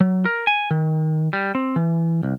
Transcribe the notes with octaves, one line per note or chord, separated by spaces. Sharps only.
F#3
A#4
G#5
D#3
G3
C4
E3
C2